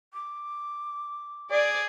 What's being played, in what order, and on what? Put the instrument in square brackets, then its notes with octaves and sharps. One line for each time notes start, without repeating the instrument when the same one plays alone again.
[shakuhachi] D6
[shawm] G#4 [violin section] D5